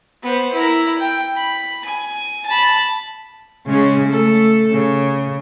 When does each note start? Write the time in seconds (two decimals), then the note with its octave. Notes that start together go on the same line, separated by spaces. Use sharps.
0.23 B3 C5
0.53 E4 A#4
0.99 G5
1.36 B5
1.85 G#5
2.46 A5 B5
3.67 C#3 G#3 C#4
4.07 A3 A4
4.71 C#3